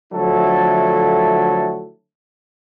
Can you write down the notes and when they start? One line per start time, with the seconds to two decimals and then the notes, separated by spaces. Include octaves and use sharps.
0.13 D3 F3 F#3 A3 E4 A4